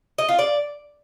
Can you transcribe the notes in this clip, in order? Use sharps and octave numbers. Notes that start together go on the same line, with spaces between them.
D#5
F4
D5